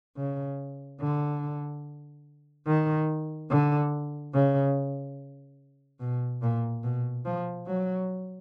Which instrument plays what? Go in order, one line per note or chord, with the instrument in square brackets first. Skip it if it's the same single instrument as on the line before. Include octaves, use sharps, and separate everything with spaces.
[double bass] C#3
D3
D#3
D3
C#3
B2
A#2
B2
F3
F#3